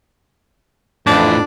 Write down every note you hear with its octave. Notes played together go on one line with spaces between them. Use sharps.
F2 A2 E3 D4